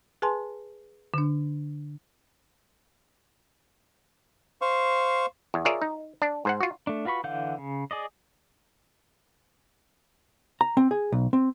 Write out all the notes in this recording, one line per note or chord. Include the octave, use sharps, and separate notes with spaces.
G#4 B4 G#5 A5 C6
D3 D4
C5 F5 C#6
E2
F4 G#4 A#4 C#5 D5 E5
D#4
D4
G#2 C5 F#5
F4 F#4
A3 D4
F4 F#4 B4 B5 C#6
D3 E3 F5 F#5 G6
C#3
G#4 D5 D#5
A#5
C4
G#4
B1
C4